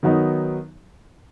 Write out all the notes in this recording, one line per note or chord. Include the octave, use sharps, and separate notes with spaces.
D#3 F#3 B3 D#4